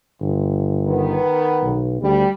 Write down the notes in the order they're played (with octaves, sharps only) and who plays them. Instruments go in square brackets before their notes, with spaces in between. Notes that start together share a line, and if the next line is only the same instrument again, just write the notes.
[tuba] G1
[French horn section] D#3 B3
[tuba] B1
[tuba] D2 [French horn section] G3